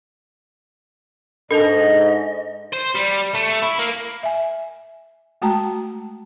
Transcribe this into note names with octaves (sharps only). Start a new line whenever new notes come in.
G#2 D4 A4 A#4 D#5 A5
C5
G3
A3
E4
A#3
E5 G#5
G#3 A3 F#4 G5 A5 A#5